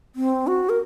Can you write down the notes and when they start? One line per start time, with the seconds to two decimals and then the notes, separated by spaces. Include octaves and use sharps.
0.16 C4
0.47 F#4
0.69 A#4